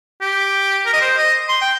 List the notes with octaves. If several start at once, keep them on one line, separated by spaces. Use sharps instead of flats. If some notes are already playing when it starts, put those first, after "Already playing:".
G4
A#4
D#5
C5
D#5
C6
G5